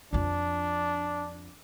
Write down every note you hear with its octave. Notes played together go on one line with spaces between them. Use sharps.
F2 F3 D4